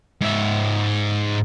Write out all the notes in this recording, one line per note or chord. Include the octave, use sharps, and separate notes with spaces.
G#2 E5